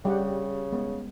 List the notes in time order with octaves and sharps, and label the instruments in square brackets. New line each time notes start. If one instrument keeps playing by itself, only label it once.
[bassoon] C#3 [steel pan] G3 G4 F#5
[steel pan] G#3 B3